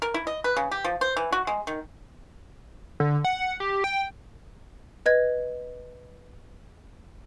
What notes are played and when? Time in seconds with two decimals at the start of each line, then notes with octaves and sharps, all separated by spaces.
0.02 A#4
0.14 E4
0.27 D#5
0.44 B4
0.57 C#3
0.71 G4
0.84 F3
1.01 C5
1.17 E3
1.32 F#4
1.47 G#3
1.67 D#3
3.00 D3
3.24 F#5
3.60 G4
3.84 G5
5.06 B4 D#5 G#6